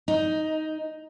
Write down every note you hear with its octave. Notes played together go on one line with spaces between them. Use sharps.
D#4